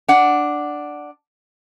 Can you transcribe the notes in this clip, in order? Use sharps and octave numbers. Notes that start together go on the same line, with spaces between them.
D4 F#5